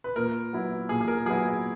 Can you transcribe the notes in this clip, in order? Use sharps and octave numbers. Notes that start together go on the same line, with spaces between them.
B4
A#2 A#4
F#3 B3 E4
A#2 G#4
G#4
A#4
F#3 B3 E4 G#4